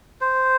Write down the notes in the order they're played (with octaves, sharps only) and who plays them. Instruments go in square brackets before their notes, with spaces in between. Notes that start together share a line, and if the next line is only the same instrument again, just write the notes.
[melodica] C5